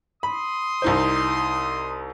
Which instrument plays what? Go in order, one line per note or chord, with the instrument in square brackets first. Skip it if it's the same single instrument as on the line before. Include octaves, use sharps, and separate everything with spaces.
[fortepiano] B5 [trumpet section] C6 D#6
[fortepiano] C2 D#4 C5